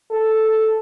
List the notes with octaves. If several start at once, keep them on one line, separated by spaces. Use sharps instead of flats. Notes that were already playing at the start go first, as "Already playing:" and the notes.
A4